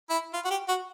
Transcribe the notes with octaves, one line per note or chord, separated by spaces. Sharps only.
E4
F4
F#4
G4
F#4